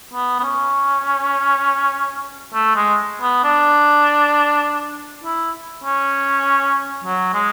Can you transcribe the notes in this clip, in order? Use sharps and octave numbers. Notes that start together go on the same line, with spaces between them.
B3
B3
C#4
A3
G#3
B3
D4
E4
C#4
F#3
G#3